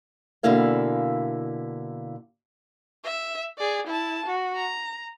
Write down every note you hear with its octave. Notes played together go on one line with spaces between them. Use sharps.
B2 D3 A#3 E4 F5 G#5
E5
G#4 D5
E4 A5
F#4
A#5